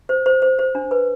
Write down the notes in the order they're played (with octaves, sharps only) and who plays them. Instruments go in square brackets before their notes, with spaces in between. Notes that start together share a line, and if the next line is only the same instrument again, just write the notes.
[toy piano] C5
C5
C5
C5
D4
B4